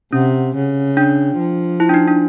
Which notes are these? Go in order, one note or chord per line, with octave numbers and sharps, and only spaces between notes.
C3 C#4
C#3
D4
F3
E4
D4
D#4
D4